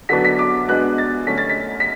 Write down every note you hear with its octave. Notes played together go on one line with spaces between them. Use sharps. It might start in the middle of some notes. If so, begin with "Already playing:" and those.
D3 F#3 B3 D4 B6
B6
D6
B2 G#3 B3 D4 F#6
A6
D3 A3 C#4 B6
A6
B6
B6